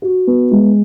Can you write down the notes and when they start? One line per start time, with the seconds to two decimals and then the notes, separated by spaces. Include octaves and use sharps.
0.02 F#4
0.27 B3
0.51 G#3